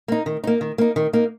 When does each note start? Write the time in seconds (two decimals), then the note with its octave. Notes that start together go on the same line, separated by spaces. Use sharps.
0.08 A#3 D#4
0.26 D#3
0.44 A#3 D#4
0.61 D#3
0.78 A#3 D#4
0.96 D#3
1.13 A#3 D#4